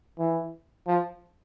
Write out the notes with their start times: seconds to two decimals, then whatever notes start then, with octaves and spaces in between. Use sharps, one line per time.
0.18 E3
0.87 F3